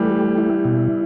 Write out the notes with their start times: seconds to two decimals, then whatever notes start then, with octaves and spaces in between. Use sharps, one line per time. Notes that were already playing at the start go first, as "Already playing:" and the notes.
Already playing: E3 G3 A3
0.10 G4
0.38 E4
0.65 B2